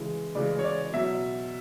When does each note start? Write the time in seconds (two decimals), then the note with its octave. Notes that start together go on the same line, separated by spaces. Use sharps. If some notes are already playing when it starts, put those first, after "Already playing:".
Already playing: C#3 E3 G#3
0.35 C#3 E3 G#3 D5
0.59 C#5
0.64 D5
0.93 B2 F#3 E5